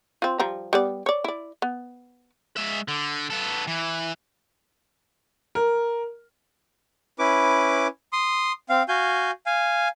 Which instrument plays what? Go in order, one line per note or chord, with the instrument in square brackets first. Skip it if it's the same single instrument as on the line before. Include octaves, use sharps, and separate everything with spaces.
[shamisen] C4 F4
F3 G3 A#5
G3 B3 D5
C#5 D5
E4 D5
B3
[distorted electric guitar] G#3 E5
D3
B3 A4
E3
[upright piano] A#4
[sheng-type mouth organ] C#4 E4 B4 D6
C6 D#6
C4 F5
F#4 F5 G#5 G6
F5 G#5